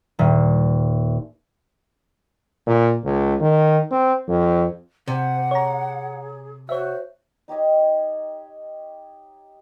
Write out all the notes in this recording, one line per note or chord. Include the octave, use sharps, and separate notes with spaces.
D#1
A#2
C#2
D#3
C4
F2
C3 C5 F#5
G#4 C#5 A#5
F#4 C5 C#5 E5
D#4 G4 C#5 D#5